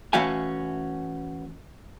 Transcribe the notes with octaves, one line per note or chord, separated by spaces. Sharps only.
E3 A3 C#4 F#4 F5 G#5